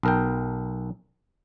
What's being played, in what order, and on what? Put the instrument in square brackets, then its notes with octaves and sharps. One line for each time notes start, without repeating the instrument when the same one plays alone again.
[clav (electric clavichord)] B1 A#4 G5